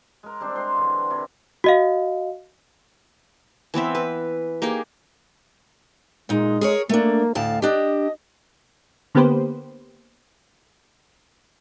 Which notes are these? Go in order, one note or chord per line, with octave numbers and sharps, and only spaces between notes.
G#3 A#4
G3 C4 D4 C5
G#3 A#4 C5 C6
D3 E3 F#5
C3 E4 G4
F#4 D#5 F5
E3 B3 C4 E5
B4
A#3 D#4 G4 G#4
A#2 G#3 D#4
G#4 A#4 C#5
A3 A#3 D4
D2 A2 F5 A5
D4 G4 D#5
D3 A#3 B3 G4 B4 C5